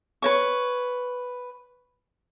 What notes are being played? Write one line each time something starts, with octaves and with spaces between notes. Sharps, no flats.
B4 C#5 C#6